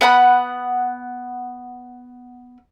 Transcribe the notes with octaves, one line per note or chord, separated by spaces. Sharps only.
B3 F#5 A5 B5